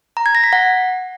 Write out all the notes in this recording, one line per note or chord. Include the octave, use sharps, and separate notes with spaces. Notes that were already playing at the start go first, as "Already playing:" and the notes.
A#5
G#6
A#6
B6
F#5